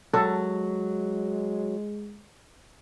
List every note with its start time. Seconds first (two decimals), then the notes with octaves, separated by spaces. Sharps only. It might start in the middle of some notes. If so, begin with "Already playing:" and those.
0.14 F#3 G#3 A4